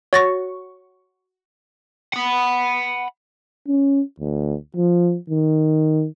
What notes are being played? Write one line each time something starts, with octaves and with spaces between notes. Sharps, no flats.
F#4 C#5 C#6 A6 A#6
F#5 B5
C#4
D2
F3
D#3